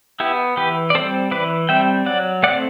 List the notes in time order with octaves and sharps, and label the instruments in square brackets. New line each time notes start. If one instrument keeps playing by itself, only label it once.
[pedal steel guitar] B3 E4 G4
E3 G4 B4
D5
G3 C4 A4 C5
E3 B4 D5
G3 C4 E5 G5
F#3 D5 F#5
A3 C4 D5 F#5